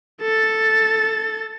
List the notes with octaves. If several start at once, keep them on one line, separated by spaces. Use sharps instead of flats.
A4 A6